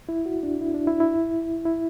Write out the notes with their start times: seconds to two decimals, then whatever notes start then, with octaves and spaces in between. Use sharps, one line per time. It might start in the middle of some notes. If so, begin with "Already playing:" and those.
0.09 E4
0.26 F#4
0.43 D4
0.61 E4
0.74 D4
0.87 E4
1.00 E4
1.66 E4